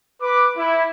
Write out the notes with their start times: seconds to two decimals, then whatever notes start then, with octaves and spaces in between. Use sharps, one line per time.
0.21 B4 D6
0.56 E4